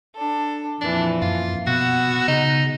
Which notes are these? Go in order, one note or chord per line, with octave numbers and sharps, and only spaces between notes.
D4 A4
F2 A#2 E3 D4
F#2 F4
B2 B3 F#4 F#5 E6
C#3 D#4